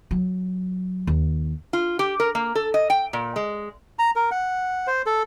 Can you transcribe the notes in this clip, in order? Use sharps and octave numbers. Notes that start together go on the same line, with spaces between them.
F#3
D#2
F4
G4
A#4
A#3
A4
D#5
G5
A#2
G#3
A#5
A#4
F#5
C5
A4